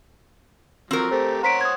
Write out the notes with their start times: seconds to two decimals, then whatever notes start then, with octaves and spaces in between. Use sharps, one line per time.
0.91 F3 F#3 C4 A#4
1.11 A3 G4 C5
1.43 C5 C#5 F#5 A#5 B6 D7
1.61 D#6 G#6